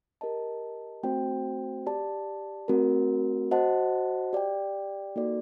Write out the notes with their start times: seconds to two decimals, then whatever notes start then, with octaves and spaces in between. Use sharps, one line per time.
0.21 G4 A#4 D#5 A5
1.03 A3 C4 F#4 C5 G5
1.87 G4 D5 A5
2.68 A3 C4 F#4 A#4
3.51 F#4 C5 D#5 F#5 A5
4.33 G4 D5 G5
5.16 A#3 D#4 F#4 A4 D5